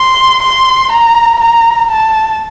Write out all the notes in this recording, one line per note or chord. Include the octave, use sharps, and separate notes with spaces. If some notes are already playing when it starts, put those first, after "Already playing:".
Already playing: C6
C6
A#5
A#5
A5